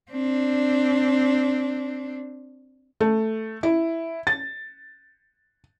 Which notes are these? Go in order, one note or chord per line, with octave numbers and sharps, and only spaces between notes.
C4 D4
A3
E4
A6